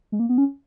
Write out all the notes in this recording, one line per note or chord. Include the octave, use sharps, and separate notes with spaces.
G#3
A#3
B3
C#4